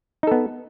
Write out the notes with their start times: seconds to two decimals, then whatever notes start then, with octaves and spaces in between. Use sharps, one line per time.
0.23 D#4
0.27 A4
0.32 B3